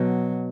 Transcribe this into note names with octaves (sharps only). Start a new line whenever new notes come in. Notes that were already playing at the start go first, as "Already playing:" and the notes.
Already playing: B2 F#3